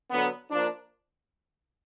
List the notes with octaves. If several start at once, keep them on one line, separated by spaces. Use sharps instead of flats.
D3 F#3 B3
F3 A#3 D4